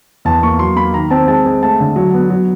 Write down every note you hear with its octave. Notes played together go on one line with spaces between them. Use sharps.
E2 A5
A#3 C#6
F#3 C6
A#3 B5
D#3 A#5
C4 A5
G#3 A5
G#3
A3 A5
D3
F#3
B3
F#3